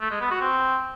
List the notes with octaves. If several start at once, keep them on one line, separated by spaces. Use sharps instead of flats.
A3
G#3
B3
F#4
C4